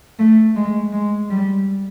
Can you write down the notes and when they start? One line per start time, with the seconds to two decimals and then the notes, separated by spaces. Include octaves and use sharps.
0.19 A3
0.56 G#3
0.93 G#3
1.30 G3